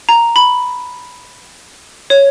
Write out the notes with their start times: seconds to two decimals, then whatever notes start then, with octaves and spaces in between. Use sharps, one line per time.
0.09 A#5
0.36 B5
2.10 C#5